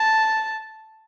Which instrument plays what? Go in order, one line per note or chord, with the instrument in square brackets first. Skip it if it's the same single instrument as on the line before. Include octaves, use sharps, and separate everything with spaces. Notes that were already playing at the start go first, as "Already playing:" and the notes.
Already playing: [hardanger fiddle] A5